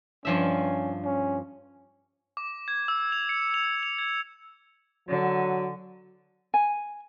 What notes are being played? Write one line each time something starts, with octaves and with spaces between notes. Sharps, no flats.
G2 F3 C#4 E5
C#4
D6
G#6
E6
F7
C#7
F7
F7
G#6
D3 F#3
G#5